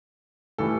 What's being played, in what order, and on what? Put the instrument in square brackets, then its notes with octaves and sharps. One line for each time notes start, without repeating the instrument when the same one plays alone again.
[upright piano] A2 E3 G3 A4